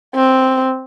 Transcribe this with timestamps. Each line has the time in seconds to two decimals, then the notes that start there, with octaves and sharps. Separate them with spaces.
0.15 C4